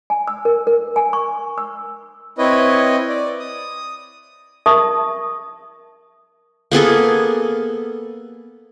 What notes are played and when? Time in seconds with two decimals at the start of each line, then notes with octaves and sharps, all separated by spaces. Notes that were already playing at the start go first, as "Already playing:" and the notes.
0.10 G#5
0.28 E6
0.45 A#4
0.67 A#4
0.96 G#5
1.13 C#6
1.58 E6
2.38 C4 E4 B4 C#5 D#5
3.09 D5
3.40 D#6
4.66 A#4 E5 A5 C#6 D#6
6.72 A#3 B3 G#4 A4